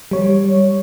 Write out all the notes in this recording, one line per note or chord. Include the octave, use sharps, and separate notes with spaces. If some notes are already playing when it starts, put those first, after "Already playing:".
G3 C#5